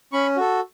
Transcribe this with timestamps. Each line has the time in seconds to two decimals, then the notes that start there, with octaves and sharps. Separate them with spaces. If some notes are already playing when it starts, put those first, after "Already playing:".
0.12 C#4 B5 C#6
0.37 F#4 A4